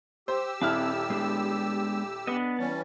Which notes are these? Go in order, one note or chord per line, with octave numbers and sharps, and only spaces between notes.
G4 C5 E6
D#1 C4 E4 F#5 A5 D6 F6
G#3 B3 D4
B3 D4 B4 D#5
E3 G3 C#4 A5